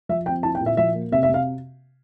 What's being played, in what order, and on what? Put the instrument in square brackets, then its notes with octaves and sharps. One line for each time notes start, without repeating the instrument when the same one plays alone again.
[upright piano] F3 E5
C4 G5
E4 A5
G5
A#2
E5
F3 E5
A#3
C3 E5
E5
C3 F5